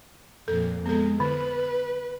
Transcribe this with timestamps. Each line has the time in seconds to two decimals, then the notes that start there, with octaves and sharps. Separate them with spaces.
0.48 F2 A#2 A4
0.86 G#3 B3 A4
1.20 D3 B4